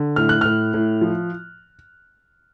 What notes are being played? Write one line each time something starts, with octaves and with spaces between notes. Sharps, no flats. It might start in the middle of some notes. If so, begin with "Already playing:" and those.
Already playing: D3
A2 F6
F#6
A2 F6
A2
F3